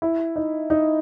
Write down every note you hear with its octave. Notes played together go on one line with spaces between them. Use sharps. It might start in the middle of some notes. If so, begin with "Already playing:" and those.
E4
D#4
D#4